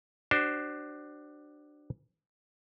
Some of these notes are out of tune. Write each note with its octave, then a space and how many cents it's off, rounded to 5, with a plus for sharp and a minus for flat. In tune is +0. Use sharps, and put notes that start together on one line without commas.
D4 +15 F#4 +40 C5 +0